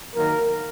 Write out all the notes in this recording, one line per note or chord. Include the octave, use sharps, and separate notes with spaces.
D#3 F#3 A#3 A#4